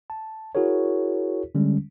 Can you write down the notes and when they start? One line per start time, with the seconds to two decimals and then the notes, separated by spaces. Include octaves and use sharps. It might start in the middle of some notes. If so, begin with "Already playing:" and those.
0.10 A5
0.55 E4 F#4 G#4 A#4 C#5
1.55 D3 G3 G#3 C#4